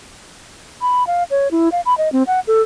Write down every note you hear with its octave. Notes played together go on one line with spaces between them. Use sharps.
B5
F5
C#5
E4
F5
B5
D#5
C4
F#5
A4